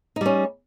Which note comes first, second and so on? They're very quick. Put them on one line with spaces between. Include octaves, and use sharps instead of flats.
D#4 G3 C#4